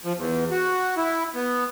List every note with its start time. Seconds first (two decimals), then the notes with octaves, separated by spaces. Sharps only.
0.05 F3
0.17 E2
0.51 F#4
0.97 E4
1.35 B3